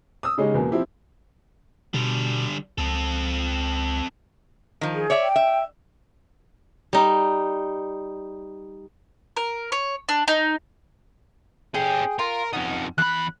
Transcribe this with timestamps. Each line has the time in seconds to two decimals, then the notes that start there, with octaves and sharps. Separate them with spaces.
0.23 D#6 E6
0.38 C#3 G#3 C#4 D#4 G4
0.54 E2 B2 A#3
0.71 F3 C4 E4 G4
1.94 B2 D3 G3
2.78 C#2 C4 A4
4.81 D#3 F3
4.94 G#4
5.10 C#5 D5 E5
5.22 G5
5.36 E5
6.93 G3 D#4
9.37 A#4
9.72 C#5
10.09 D4
10.28 D#4
11.74 C#4 G4 G#4 G5
12.19 F4 A#4
12.53 F2 B3 C#4 D#4
12.98 E2 B5 F#6